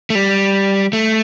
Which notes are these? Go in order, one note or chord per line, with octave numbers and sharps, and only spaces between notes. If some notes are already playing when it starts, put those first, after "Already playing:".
A3
G3
A3